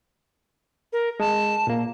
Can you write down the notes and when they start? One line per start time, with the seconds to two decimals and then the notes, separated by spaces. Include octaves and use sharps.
0.93 A#4
1.20 G#3 A5
1.67 A#2 A#3